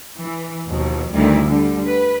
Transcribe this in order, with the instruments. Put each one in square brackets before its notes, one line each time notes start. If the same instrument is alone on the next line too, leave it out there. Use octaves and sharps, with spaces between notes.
[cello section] E3
D#2 B2 F3
D2 D#3 G3 E4
D3 G3
B4